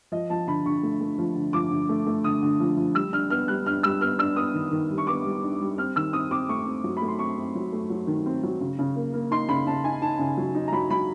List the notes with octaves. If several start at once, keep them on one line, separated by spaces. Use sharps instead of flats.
F3 D#5
F3 A5
D3 B5
D3 C#6
A3
A3
F3
D3
F3 D6
D3
A3
A3
D3 D#6
D3
F3
F3
G3 E6
D4 F6
B3 F6
G3 F#6
D4 F6
G3 E6
B3 F6
D4 E6
B3 D#6
D#3
D#3
G3
C#6
B3 D6
G3
D4
G3
C4 F6
D#3 E6
C4 D#6
C4 D6
A3 C#6
C4
F#3
B5
A3
C6
C4 C#6
C4
F#3
A3
F#3
D#3
C4
F#3
C#3
C#3
A#3
A#3
D#4 C6
C#3 B5
C#3 A5
D#4 G#5
D#4 A5
C#3
F#3
D#4
A#5
F#3 B5
F#3 B5